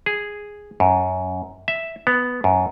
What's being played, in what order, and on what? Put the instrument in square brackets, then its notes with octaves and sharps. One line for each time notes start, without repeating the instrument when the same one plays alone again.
[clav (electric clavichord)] G#4
F#2
E5
B3
F#2